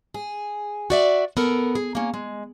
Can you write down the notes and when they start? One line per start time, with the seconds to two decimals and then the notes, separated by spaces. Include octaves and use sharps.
0.14 G#4
0.90 F#4 D5 E5
1.37 B3 A4 A#4
1.75 G#4
1.95 A#3 C#4
2.14 G#3